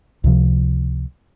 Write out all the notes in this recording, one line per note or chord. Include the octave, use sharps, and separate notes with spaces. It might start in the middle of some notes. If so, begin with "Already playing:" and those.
C#2 C3 F3